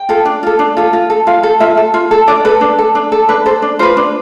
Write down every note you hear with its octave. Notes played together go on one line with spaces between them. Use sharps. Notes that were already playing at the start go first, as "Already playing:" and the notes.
Already playing: G5
F4 A4
D4
F4 A4
D4
F4 A4
F4
A4
F4 F5
A4
F4 E5
A4
F4
A4
D4 D5
A4 B4
D4
A4
D4
A4
D4 B4
A4 C5
D4
F4 B4 C5
D4